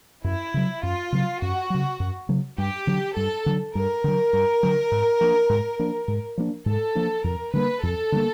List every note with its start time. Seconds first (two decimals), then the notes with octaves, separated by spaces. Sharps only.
0.24 F#2 E4
0.54 C#3 F#3
0.83 F#2 F4
1.12 C#3 F#3
1.42 F#2 F#4
1.70 C#3 F#3
2.00 F#2
2.29 C#3 F#3
2.58 G2 G4
2.87 D3 F#3
3.16 G2 A4
3.46 D3 F#3
3.75 G2 A#4
4.04 D3 F#3
4.33 G2
4.63 D3 F#3
4.92 G#2
5.21 F3 A#3 D4
5.49 G#2
5.79 F3 A#3 D4
6.08 G#2
6.38 F3 A#3 D4
6.66 G#2 A4
6.95 F3 A#3 D4
7.24 F2 A#4
7.53 D3 G3 A#3 B4
7.83 F2 A4
8.12 D3 G3 A#3